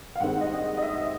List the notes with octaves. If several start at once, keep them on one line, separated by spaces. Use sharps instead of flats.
F5
G2 D#3 G#3 C4 F#5
D#5
D#5
E5